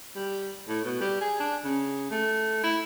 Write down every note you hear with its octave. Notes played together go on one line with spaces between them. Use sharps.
G3
A2
B2
G3
G#4
D4
C#3
A3
E4